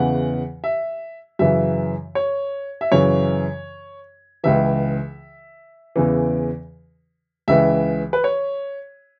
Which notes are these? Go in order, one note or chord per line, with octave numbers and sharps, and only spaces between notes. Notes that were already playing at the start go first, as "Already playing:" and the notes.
Already playing: E2 C#3 E3 F#5
E5
F#2 C#3 E3 E5
C#5
E5
F#2 C#3 E3 C#5
C#2 C#3 E3 E5
E2 C#3 E3
C#2 C#3 E3 E5
B4
C#5